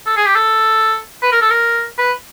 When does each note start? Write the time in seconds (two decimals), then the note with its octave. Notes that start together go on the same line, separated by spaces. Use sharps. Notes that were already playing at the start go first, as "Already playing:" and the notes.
0.06 A4
0.16 G#4
0.26 G4
0.36 A4
1.22 B4
1.32 A#4
1.41 A4
1.51 A#4
1.98 B4